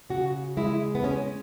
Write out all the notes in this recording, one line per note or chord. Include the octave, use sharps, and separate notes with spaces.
C#3 F#4
G#3 E4
B3
G#3 C#4